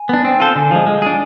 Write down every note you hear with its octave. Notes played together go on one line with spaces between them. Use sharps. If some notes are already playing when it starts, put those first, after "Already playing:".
Already playing: G#5
B3 D4
C4
F4 A4 C5
D3 G#5
F3 G#3
G#3
D4 G#4